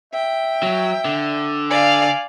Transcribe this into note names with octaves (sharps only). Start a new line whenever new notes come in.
E5 G5
F#3
D3
D5 F5 G#5